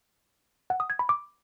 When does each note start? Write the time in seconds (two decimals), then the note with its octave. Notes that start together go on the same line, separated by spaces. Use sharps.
0.70 F#5
0.80 D#6
0.90 G#6
0.99 B5
1.09 D6